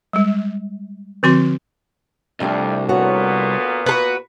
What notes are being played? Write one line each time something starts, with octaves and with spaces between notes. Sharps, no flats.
G3 G#3
D3 F3 C4 F#4 C6
C2 F2 A3 D4 G4
A#2 A#3 B3 F#4 A4 C#5
F#4 A4 B4